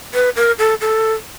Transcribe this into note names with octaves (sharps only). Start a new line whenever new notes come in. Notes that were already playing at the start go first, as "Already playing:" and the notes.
B4
A#4
A4
A4